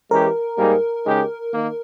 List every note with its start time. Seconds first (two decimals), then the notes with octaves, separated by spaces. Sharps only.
0.11 E3 G#3 C#4 G4 A#4
0.57 G#2 G3 A#3 D#4 G#4
1.05 C#3 G#3 D#4 G4
1.52 D#3 A#3